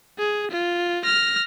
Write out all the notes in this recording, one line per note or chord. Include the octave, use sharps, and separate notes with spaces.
G#4
F4
F6 A#6